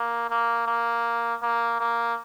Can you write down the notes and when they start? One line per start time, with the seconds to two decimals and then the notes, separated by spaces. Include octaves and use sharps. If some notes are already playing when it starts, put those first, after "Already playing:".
Already playing: A#3
0.30 A#3
0.67 A#3
1.42 A#3
1.80 A#3